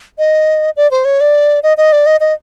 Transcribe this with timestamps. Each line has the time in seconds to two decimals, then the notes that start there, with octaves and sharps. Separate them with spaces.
0.18 D#5
0.76 D5
0.91 C5
1.05 C#5
1.20 D5
1.63 D#5
1.77 D#5
1.92 D5
2.06 D#5
2.20 D#5